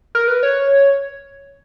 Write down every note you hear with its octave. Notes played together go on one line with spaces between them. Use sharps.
A#4
B4
C#5